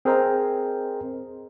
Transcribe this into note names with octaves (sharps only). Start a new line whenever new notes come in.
C4 G#4 A#4 C5 D#5 A#5